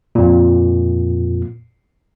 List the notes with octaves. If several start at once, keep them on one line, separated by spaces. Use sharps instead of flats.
F2 A#2